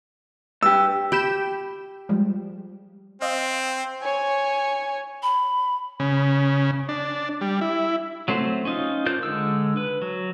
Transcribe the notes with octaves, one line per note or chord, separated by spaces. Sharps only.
G2 G4 E6
G4 B5 G6 E7
F3 G3 G#3
C4 D#5 F5
C#5 G#5
B5
C#3
D4
G3
E4
F#3 A3 C4 C5
C#4 D#4 F4
D4 F4 A#4 C5 G6
D3 G#3 E6
B4
F#3